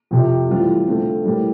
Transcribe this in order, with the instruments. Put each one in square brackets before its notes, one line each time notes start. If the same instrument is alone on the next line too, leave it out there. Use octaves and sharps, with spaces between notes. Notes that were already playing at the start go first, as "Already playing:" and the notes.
[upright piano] F2 C3 F3
A2 E3 G3 C4 F4
D3 A3 C4 F4
A2 G3 A#3